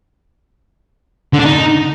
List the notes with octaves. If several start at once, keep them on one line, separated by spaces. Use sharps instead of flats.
D3
D4
D#4